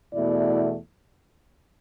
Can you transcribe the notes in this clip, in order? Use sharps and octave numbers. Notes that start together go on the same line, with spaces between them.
E2 B2 A3 E4 D5